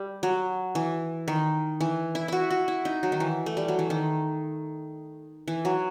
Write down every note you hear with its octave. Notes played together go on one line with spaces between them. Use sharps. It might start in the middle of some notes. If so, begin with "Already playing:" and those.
Already playing: G3
F#3
E3
D#3
E3
E4
E4 F#4
F#4
E4
D#4
F#3
D#3
E3
A3
G3
F#3
E3
D#3
E3
F#3